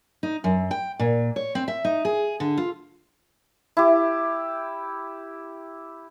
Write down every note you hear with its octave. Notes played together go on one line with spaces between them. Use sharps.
D#4
F#2
G5
A#2
C#5
C4
E5
D#4
G#4
D3
F4
E4 G4